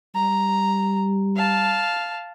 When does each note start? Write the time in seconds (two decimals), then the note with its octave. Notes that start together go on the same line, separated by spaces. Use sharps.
0.15 G3 A#5
1.37 F5 A5